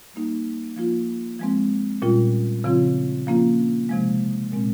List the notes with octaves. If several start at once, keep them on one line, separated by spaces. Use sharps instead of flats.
G3 A#3 D#4
F3 A#3 F4
F3 G#3 C4
A#2 G3 C#4 F4
C#3 F3 C4 F4
F3 A#3 C#4 F4
C3 F3 G#3
A#2 G#3 C4